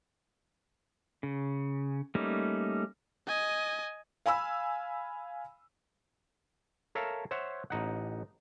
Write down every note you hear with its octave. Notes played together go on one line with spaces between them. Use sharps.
C#3
G3 A3 A#3 C#4 D#4
D#5 G#5
F5 G#5 B5 E6
A4 A#4 C#5 E5 F5
C5 C#5 E5 F#5
A1 D#4 F#5